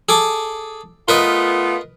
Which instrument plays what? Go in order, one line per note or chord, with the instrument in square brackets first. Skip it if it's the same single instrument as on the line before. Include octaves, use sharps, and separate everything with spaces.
[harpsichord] G#4 A4 D6
[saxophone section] A3 B3 F4 [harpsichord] A#4 B4 D#5